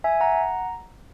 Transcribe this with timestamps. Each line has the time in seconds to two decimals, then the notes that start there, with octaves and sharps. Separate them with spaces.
0.04 E5 G#5
0.20 F#5 A#5